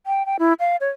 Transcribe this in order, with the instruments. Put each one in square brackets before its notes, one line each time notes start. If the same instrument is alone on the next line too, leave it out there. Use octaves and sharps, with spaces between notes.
[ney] G5
G5
E4
F5
C#5